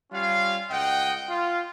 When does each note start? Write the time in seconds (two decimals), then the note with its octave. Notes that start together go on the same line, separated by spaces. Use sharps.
0.12 G3 C#4 F4 C#5 F5
0.70 C#2 D#5 F#5 G5
1.29 F4